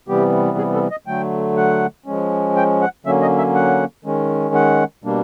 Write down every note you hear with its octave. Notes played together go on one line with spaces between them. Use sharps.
C3 E3 G3 B3 G4
G#4
A4
D#5
D3 F#3 A3 G5
F#5
F3 G#3 C#4
G5
F#5
D3 F#3 A#3 C#4 E5
D#5
E5
F#5
D#3 G#3 C#4
F#5
B2 G3 A#3 D4